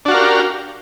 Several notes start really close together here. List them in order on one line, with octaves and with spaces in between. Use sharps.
D4 F#4 F5 A#4 G4